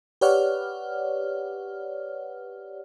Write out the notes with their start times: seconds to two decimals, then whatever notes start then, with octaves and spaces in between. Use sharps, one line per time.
0.21 G4 B4 C#5 D5 F#5 F6